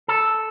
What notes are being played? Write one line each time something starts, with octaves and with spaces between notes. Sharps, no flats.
A4